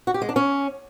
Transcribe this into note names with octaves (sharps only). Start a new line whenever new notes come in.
F#4
G4
G#3
D4
C#4